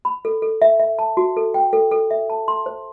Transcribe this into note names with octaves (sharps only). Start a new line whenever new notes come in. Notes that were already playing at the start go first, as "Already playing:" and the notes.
B5
A4
A4
E5
E5
A5
F#4
A4
G5
A4
A4
E5
A5
C6
C5